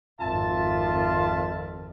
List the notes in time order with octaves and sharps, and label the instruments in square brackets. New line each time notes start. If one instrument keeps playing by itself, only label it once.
[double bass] G#1 F2 [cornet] F4 [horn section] E5 A5